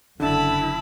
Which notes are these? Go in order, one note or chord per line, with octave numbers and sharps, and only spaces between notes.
F#1 D3 E4 A5 B5